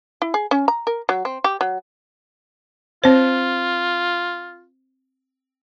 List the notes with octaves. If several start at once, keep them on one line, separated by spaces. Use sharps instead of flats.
E4
G#4
C#4
A#5
A#4
F#3
C4
G4
F#3
C4 F4 C5